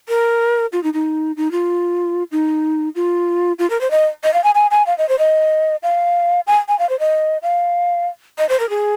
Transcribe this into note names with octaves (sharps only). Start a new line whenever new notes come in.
A#4
F4
D#4
D#4
D#4
F4
D#4
F4
F4
A#4
C5
D#5
D#5
F5
G#5
G#5
G#5
F5
D#5
C5
D#5
F5
G#5
G#5
F5
C5
D#5
F5
D#5
C5
A#4
G#4